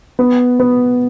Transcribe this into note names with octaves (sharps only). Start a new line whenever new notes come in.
B3
B3